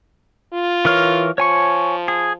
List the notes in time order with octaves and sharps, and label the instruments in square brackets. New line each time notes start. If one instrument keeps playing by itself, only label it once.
[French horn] F4
[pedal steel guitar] E3 A#4 C#5
[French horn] F3 [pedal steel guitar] C#5 G#5 C#6
[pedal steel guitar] G#4